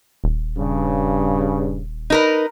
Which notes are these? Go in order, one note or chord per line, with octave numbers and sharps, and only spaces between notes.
D#1
G2 C#3
D#4 A#4 B4